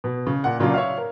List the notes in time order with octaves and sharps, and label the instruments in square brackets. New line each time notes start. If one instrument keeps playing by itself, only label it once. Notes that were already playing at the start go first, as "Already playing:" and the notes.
[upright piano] B2
C#3
A#2 F#5
A#2 C#3 F#3 D4 F4
C#5 E5 F5
A#4